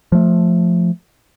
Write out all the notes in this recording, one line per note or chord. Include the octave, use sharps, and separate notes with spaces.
F3 A3